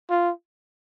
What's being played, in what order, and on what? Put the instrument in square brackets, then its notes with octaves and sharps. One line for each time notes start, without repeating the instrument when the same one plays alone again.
[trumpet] F4